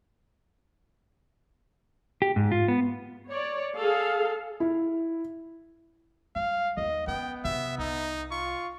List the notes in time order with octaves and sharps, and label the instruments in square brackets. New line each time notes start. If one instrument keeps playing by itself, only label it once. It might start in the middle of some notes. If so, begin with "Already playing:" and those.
[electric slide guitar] G4
G#2
F4
B3
[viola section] C#5 D5
G#4 A4 F5
[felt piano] E4
[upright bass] G3 [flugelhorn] F5
[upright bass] D#2 [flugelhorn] D#5
[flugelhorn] B3 [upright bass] C#4 [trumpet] G5
[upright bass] C3 [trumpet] E5
[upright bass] C2 [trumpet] D#4
[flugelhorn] F4 [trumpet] C#6